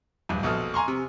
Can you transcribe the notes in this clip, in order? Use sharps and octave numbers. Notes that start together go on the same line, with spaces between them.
D1 G2
A#1 B2 A4 D#6 F6
G#5 A#5 C6 C#6
C3